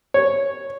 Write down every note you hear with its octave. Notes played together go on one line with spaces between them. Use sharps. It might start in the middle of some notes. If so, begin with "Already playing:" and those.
C#5